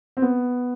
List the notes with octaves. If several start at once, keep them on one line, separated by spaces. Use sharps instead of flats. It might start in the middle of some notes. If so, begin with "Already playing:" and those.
C4
B3